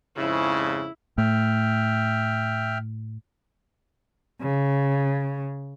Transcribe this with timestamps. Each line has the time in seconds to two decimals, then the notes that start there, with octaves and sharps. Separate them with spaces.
0.17 F2 G#2 C#3 E4
1.18 A2 E5 G5 F6
4.41 C#3